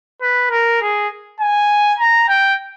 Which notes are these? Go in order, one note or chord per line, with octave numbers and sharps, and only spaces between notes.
B4
A#4
G#4
G#5
A#5
G5